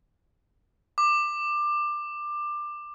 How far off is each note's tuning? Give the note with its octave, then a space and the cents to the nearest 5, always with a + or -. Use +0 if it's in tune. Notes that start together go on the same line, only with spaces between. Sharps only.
D6 +20